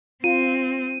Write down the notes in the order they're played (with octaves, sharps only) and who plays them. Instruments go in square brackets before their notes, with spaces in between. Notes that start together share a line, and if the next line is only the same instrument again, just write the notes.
[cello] C4 [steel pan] F4 [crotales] D#7